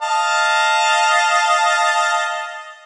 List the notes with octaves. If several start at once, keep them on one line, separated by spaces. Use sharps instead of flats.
D#5 F5 A5